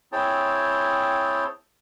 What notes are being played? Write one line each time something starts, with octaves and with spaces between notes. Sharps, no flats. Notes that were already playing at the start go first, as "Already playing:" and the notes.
C4 E4 G#4 C#5 G5 A5